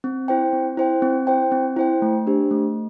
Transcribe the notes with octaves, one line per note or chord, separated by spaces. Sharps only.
C4
E4 C5 G5
C4
E4 C5 G5
C4
E4 C5 G5
C4
E4 C5 G5
A3
D4 G4 C5
A3